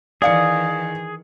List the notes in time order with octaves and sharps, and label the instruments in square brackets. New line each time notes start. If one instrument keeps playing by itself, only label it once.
[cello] D#3 E3 [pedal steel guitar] G#4 [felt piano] D5 F5 C#7